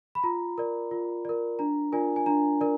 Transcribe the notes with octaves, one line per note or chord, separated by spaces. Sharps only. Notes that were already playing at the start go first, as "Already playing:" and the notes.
B5
F4 A#5
A#4 D5
F4
A#4 D5
D4 A#5
F4 A#4 D5 G#5
G#5
D4 A#5
A#4 D5